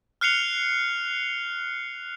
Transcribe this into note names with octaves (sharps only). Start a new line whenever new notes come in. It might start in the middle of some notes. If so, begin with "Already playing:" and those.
F6 F#6 C7 C#7 F7 G7